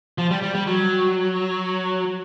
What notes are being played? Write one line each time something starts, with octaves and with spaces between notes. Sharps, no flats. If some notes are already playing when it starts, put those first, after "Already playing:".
F3
G3
G3
G3
F#3